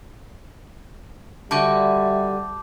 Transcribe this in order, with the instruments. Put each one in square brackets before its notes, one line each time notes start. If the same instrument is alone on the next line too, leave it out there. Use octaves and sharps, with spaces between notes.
[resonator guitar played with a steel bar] D3 F#4 [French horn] G3 [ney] E5 [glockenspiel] A5 D6 G6